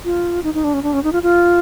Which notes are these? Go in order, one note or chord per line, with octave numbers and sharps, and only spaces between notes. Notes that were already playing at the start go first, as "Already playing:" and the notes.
F4
D#4
D#4
D4
C#4
D4
C#4
D#4
F4
F4